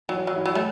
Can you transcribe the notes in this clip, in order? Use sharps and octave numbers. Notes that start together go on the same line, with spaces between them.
E3 F#3
F#3
E4
F#3
A3